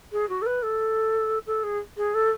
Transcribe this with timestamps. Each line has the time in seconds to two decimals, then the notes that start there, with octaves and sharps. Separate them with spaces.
0.12 G#4
0.29 F#4
0.42 A4
0.46 B4
0.62 A4
1.46 A4
1.63 G#4
1.97 G#4
2.14 A4